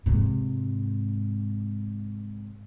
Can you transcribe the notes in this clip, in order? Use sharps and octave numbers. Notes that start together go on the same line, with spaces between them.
G#2 C3